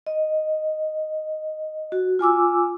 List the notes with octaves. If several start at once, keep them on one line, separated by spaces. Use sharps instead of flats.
D#5
F#4
F4 G#5 D6 E6